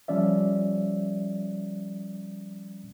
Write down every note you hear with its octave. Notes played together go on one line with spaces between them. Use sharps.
F3 G3 C#4 D5 E5